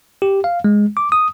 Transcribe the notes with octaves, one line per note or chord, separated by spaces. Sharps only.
G4
F5
G#3
D6
D#6